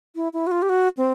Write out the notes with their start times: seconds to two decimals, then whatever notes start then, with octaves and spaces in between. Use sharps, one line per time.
0.16 E4
0.33 E4
0.47 F#4
0.51 F4
0.62 G4
0.69 F#4
0.97 C4